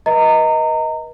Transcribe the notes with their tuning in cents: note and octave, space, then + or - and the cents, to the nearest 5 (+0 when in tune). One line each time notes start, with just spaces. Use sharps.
B4 -40 D#5 +15 A#5 -25